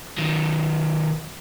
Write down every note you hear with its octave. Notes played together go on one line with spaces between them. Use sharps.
D#3 F#3